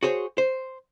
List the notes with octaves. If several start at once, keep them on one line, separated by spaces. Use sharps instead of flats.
F#4 G#4 C5 C#5
C5